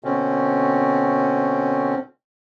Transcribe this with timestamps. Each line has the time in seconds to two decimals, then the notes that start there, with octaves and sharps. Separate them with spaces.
0.04 B2 D3 C4 C#4